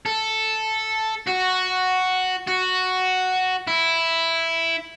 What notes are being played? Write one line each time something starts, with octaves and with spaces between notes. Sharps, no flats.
A4
F#4
F#4
E4